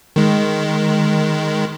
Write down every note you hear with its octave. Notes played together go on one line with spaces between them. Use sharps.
D#3 G#3